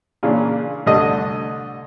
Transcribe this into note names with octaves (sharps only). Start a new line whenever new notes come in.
A#2 C#3 E3 D4
C2 D3 A3 D4 D#5 D#6